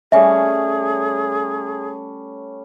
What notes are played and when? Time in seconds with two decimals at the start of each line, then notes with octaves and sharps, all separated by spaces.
0.12 G3 A3 C#4 G#4 E5